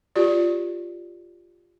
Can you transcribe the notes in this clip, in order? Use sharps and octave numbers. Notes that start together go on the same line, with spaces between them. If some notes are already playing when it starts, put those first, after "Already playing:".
F4 G4 D5